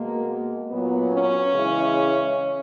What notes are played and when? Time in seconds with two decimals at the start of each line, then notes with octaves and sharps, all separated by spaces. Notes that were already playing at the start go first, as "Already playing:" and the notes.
Already playing: B2 G#3 A#3
0.69 A#2 F#3 B3
1.10 C#4
1.51 C#3 E3 G#3